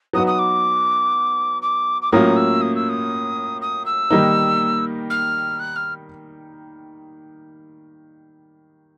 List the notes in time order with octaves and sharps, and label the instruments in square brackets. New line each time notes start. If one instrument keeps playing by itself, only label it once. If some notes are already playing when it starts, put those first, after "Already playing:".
[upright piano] F#3 B3 D#4 F#4 B4 [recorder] D#6
[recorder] D#6
D6
D6
D6
[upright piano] A2 F#3 A#3 C#4 F4 [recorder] D#6
[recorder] E6
D#6
E6
D#6
D#6
E6
[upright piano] D#3 G3 A#3 D#4
[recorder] F6
F#6
F6